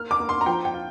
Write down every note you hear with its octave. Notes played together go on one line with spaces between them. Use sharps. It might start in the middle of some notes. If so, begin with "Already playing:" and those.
Already playing: A#3 F6
D6
A#3
C6
A#5
F3 G5
G5
F4